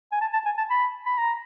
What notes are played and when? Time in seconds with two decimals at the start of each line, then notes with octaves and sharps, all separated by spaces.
0.12 G#5
0.21 A5
0.33 A5
0.45 G#5
0.58 A5
0.70 B5
1.06 B5
1.18 A#5